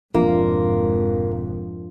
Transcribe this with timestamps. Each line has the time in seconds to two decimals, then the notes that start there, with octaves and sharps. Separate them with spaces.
0.15 E1 F2 G#2 F3 A#3 D4 F4